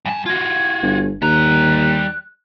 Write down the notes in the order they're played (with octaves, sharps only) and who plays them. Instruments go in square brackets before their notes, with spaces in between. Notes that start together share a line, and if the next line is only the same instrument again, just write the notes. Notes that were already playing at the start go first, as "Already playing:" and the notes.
[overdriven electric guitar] G2 A5 [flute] G#5
[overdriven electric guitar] F4 F#4 [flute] G#6
[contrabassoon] G1
[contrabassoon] D#2 [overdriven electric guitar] G3 A#5 [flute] F#6